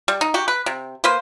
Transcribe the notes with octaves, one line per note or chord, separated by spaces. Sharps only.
G3
D#4
F#4 G4
B4
C3
A#3 B4 C5